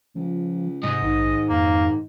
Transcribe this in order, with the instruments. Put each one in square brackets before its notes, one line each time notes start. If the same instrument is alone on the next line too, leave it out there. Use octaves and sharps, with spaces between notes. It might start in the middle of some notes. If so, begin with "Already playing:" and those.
[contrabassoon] C#2 [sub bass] F3
[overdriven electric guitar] G#2 [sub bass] C3 [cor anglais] D#5
[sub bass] A#1 [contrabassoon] D#3
[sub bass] F2 [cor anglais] A#3